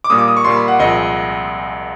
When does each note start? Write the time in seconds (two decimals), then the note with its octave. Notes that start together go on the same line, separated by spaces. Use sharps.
0.04 D6
0.10 A#2 G3 A#3 D#6
0.18 D6
0.28 D#6
0.37 C#6
0.44 A#2 G3 A#3 C6
0.56 B5
0.68 F#5
0.79 C2 A#2 F3 G#3 D#5